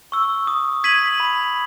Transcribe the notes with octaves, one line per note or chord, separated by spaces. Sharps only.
C#6 E6
D#6
G#6 B6 D#7 F#7
B5